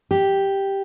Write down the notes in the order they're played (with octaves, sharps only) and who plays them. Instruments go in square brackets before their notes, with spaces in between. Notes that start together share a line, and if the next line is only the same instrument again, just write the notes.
[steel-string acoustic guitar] G4